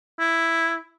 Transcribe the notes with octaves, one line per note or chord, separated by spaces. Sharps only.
E4